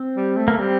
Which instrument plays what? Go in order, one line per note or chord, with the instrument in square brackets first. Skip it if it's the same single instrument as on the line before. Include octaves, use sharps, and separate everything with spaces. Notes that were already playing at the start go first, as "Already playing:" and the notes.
Already playing: [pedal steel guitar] C4
[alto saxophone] G3
A3
[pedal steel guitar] A#3
[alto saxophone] G3 [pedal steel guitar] C4